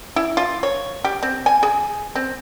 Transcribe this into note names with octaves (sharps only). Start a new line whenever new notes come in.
E4
F4
C#5
G4
C4
G#5
G#4
C4